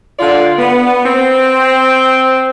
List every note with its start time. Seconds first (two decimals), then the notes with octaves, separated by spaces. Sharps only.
0.19 D3 F4 D5
0.59 B3
1.05 C4